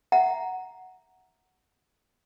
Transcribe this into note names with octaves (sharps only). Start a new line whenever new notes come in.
E5 F#5 A#5